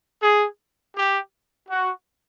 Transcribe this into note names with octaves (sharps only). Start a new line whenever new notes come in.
G#4
G4
F#4